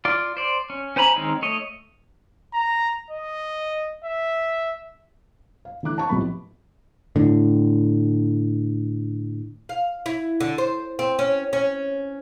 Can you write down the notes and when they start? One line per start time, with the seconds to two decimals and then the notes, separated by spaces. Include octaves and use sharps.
0.05 F4 D5
0.37 C5 D5
0.70 C#4
0.96 C#4 C5 G#5 A#5 B5
1.16 D#3 G#3 C4 C#4 D#4
1.42 A3 C#5 D#5
2.54 A#5
3.11 D#5
4.04 E5
5.65 F5
5.83 D3 E3 A3 D6 F#6
5.96 F5 A5 C#6
6.09 B1 A2 C3 F3 B3 B5
7.16 A2 D3
9.69 F5
10.06 E4
10.40 D3
10.58 C5
10.99 C4
11.19 C#4
11.53 C#4